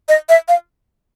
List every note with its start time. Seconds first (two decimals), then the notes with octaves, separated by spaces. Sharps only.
0.09 D#5
0.29 E5
0.48 F5